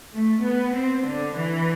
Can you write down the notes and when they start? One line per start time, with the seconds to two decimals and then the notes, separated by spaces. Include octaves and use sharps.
0.14 A3
0.45 B3
0.75 C4
1.05 D3
1.36 E3